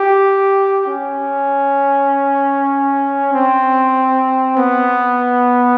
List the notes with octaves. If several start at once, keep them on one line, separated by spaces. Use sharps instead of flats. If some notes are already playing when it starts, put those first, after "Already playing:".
Already playing: G4
C#4
C4
B3